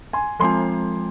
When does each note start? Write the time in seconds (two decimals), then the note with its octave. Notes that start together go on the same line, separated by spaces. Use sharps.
0.13 G#5 C6
0.40 F3 G#3 C4 F4 G#5 C6